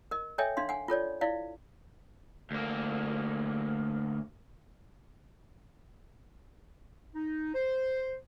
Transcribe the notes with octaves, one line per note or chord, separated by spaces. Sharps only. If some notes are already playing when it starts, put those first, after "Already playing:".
A#4 D#5
A4 C#5 D#5 E5 G5 G#5
D4 D#4 F5 C6
F#5 G#5
F4 A4 C#5 D5
E4 D5 F5
D2 A#3
D#4
C5